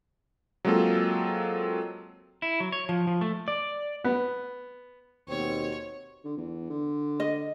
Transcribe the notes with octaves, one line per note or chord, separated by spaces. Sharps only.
F#3 G#3 A#3 C4 F4 A4
E4
F#3
C#5
F3
F3
A3
D5
B3
D#2 B2 C4 C#5
D3
E2
D3
D#5